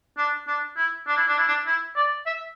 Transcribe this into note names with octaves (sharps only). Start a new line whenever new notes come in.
D4
D4
E4
D4
E4
D4
E4
D4
E4
D5
E5